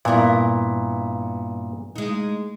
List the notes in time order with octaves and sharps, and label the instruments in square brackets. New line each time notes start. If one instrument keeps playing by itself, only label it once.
[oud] G2 A#4 [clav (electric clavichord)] A#2 B3 E4
[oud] G#3 D#4